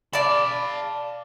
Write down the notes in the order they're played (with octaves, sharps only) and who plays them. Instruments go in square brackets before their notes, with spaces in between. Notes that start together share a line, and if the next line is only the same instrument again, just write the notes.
[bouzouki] D5 A5 [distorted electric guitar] F5 B5